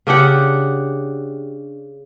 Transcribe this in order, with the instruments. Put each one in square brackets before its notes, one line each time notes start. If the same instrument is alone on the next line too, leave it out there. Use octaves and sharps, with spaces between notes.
[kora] C#3 D4 G4 F#5